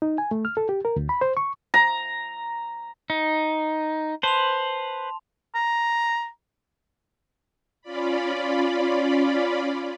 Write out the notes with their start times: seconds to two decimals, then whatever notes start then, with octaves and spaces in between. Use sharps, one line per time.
0.02 D#4
0.18 G#5
0.31 A3
0.45 F6
0.57 A4
0.69 G4
0.85 A#4
0.96 D2
1.09 B5
1.21 C5
1.37 C#6
1.74 A#5
3.10 D#4
4.23 B4 C5 A5 C6 F7
5.55 A#5
7.82 C#4 F4 D5 B5